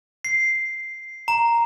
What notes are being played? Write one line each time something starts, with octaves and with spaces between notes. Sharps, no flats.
C7
A#5